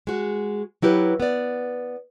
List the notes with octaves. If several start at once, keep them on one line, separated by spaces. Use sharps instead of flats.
G#3 F#4
F#3 E4 G4 B4
B3 D5